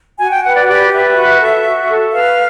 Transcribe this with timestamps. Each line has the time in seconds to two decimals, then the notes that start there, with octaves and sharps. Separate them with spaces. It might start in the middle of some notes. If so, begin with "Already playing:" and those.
0.19 F#4 G#5
0.31 G5
0.44 B4 F#5
0.55 D5
0.68 G4 D5
0.93 B4 E5
1.16 F#4
1.41 A4
1.65 F#4
1.89 A4
2.13 B4 F5